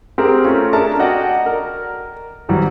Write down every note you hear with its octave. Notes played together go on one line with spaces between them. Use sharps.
C4 G4 G#4 A#4
A3 C#4 F4
D4 G#4 A#4 E5 A5 A#5
F#4 D5 D#5 F#5 G5
A#4
G#1 E3 F#3 G3